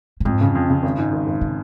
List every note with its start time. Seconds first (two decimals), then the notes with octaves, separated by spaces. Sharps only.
0.20 A#2
0.25 F2 G#2
0.41 C#3
0.55 F2
0.70 C#3
0.83 G#1
0.98 G#2
1.13 G#1
1.27 G#1
1.41 C#3